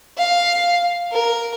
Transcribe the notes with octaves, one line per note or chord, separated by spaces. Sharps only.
F5
A#4